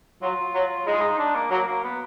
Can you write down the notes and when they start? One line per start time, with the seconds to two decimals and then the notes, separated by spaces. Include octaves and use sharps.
0.22 F#3 F4
0.55 F#3
0.87 G#3 D#4
0.94 F4
1.01 D#4
1.19 D4
1.35 A#3
1.51 F#3 A#3
1.68 A#3
1.84 B3